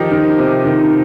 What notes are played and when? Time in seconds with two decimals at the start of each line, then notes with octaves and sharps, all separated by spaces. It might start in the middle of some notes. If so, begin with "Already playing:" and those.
Already playing: D#3 F3 D#4 G4
0.11 D#3
0.39 C3
0.65 D#3